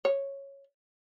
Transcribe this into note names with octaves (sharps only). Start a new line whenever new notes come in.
C#5